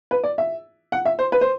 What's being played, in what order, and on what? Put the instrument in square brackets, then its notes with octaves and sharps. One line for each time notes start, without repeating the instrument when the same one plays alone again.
[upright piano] B4
D5
E5
F#5
E5
C5
B4
C5